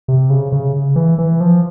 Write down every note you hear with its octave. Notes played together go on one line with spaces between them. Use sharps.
C3
C#3
C#3
E3
E3
F3